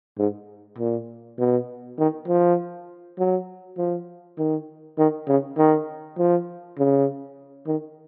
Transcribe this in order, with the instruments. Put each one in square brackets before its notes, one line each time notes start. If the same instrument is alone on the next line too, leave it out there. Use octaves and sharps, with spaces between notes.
[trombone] G#2
A#2
B2
D#3
F3
F#3
F3
D#3
D#3
C#3
D#3
F3
C#3
D#3